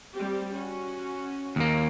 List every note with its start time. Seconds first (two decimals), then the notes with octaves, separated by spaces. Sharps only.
0.16 G3 C4 G4
0.54 C#4 F#4
1.56 D#2 A#3